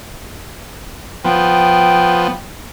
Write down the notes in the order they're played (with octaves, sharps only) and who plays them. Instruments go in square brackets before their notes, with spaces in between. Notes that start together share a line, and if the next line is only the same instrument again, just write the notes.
[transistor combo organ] F3 B3 [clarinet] G5